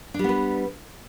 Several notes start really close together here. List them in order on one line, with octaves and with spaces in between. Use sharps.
D4 G3 B3 B4